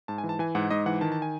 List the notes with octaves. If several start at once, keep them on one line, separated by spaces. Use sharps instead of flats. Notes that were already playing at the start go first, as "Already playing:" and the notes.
G#2 A5
G#5
E3
A5
E3 G#5
G#2 F#5
G#2 D#5
E3 F#5
D#3 A5
A5
G#5